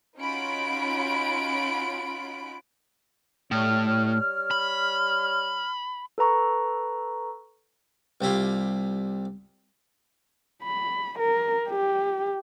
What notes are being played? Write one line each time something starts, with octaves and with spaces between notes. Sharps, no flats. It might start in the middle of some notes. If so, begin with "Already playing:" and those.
C#4 D#4 F4 F#4 B5 D7
A2 G3 C#5 F6
B5
A4 B4 A#5 C#6
C2 G3 E4 F4
B5
A#4
G4